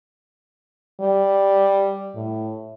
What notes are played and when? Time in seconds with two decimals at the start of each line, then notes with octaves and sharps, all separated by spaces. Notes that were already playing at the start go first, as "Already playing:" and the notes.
1.01 G3
2.15 A2